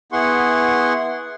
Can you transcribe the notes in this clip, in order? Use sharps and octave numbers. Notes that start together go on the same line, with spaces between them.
B3 E4 G#4 F#5 C6 C#6